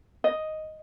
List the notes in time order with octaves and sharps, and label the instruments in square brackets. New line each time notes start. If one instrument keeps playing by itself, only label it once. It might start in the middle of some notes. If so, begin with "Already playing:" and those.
[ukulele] D#5